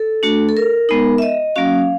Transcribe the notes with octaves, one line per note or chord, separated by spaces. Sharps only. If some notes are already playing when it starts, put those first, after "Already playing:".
Already playing: A4
A3 D4 F#4
A4
A#4
G#3 B3 D#4
E5
D#5
F#3 A#3 C#4 F#4 F5